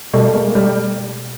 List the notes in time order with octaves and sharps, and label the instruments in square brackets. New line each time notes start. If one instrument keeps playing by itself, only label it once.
[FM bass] B2 [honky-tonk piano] G3 A3
[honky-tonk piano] G#3 A#3
G3 A3